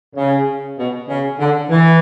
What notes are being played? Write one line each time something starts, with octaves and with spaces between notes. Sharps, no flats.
C#3
B2
C#3
D3
E3